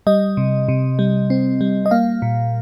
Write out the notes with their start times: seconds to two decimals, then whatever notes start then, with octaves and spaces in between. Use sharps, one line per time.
0.07 G3 D#5
0.37 C3
0.69 C3
0.99 G3
1.30 C4
1.61 G3
1.86 D#5
1.91 A#3 F5
2.22 A#2